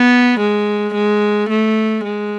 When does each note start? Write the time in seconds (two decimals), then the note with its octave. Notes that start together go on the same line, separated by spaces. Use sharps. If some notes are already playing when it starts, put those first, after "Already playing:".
Already playing: B3
0.40 G#3
0.94 G#3
1.50 A3
2.04 G#3